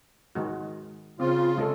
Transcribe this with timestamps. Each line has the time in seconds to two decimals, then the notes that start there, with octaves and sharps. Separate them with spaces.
0.35 D#3 G#3 F#4
1.20 C#3 C4 F4
1.58 G#3 C#4 A4